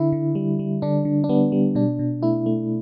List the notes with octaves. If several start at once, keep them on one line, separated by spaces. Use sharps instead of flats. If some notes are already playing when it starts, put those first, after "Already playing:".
Already playing: D3 E4
D3
G3
G3
D3 D4
D3
D4
G3 B3
G3
B2 D4
B2
A3 E4
A3